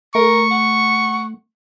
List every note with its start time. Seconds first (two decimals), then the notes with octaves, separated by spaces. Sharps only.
0.15 A3 A#4 C#6
0.51 F#5